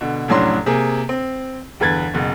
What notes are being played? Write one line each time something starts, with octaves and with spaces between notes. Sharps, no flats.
B2 D3
F1 A2 F#3 C#4 D4 C6
C3 A#3 G#4
C4
G1 E2 B4 G#6 A6
F#1 B2